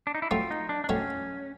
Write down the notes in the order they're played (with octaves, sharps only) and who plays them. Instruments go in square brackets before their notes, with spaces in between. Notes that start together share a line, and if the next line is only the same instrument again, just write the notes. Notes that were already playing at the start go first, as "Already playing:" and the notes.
[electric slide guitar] D4
D#4
E4
[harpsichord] F#3 A3 C4 [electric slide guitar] F4
[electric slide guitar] D#4
D4
D4
[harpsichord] F#3 A3 C4 [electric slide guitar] C#4